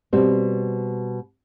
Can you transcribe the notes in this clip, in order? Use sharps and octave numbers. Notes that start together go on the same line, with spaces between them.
B2 G3 C4